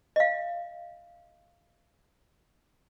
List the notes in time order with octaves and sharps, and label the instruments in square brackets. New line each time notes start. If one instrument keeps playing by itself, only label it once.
[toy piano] D#5 F5